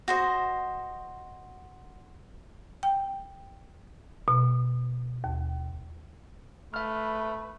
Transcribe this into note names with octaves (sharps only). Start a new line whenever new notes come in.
F#4 C5 D#5
G5
B2
D#2
A3 B4 E5 F6